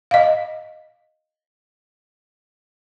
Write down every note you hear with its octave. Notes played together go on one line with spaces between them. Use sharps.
D#5 F5